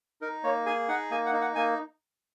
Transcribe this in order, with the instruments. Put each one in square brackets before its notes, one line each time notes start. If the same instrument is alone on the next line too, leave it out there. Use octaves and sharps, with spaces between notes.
[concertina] D#4 A#4
A#3 C#5
G#4 G#5
D#4 F#5
A#3 G#5
F#5
D#4
F#5
A#3 G#5